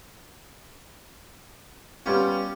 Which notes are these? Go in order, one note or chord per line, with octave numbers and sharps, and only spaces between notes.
G3 B3 C#4 F4 G4